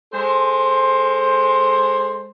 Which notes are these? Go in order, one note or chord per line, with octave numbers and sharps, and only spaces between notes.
G#3 A4 C5